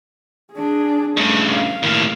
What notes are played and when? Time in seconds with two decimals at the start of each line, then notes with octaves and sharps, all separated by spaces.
0.53 D4 G#4
1.17 G2 C#3 A3
1.54 F5
1.83 D#2 A2